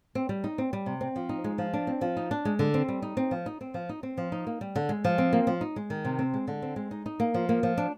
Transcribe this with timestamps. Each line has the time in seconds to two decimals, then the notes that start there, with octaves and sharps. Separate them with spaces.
0.15 C4
0.29 G3
0.44 D#4
0.58 C4
0.73 G3
0.86 C3
1.01 C4
1.16 F3
1.29 D#4
1.44 G#3
1.58 F3
1.73 D4
1.87 C4
2.01 F3
2.17 D#4
2.31 D4
2.45 G#3
2.59 D3
2.74 C4
2.88 G3
3.02 D#4
3.17 C4
3.31 F3
3.46 D#4
3.61 C4
3.74 F3
3.89 D#4
4.03 C4
4.17 F3
4.32 D#4
4.47 A#3
4.61 G3
4.76 D3
4.89 G#3
5.04 F3
5.18 C4
5.33 A#3
5.47 F3
5.61 D#4
5.76 G#3
5.90 D#3
6.05 C3
6.19 C4
6.34 G#3
6.48 D3
6.62 C4
6.76 G#3
6.91 D#4
7.06 D#4
7.20 A#3
7.34 F3
7.49 A#3
7.63 F3
7.78 D4